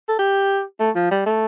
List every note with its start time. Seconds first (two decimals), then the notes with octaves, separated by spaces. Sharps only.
0.08 A4
0.19 G4
0.80 A3
0.95 F3
1.11 G3
1.26 A3